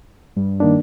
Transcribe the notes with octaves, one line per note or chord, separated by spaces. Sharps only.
G2
D#3 A#3 D4